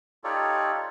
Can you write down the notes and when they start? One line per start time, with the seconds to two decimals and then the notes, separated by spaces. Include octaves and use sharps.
0.24 D#4 F4 G4 A4 C#5 D5